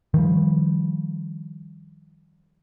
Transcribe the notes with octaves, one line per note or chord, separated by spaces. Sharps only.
D#3 F3 G3